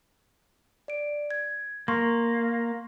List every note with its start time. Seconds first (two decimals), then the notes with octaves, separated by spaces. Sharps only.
0.88 D5 D7
1.31 G#6
1.88 A#3 C6 C#6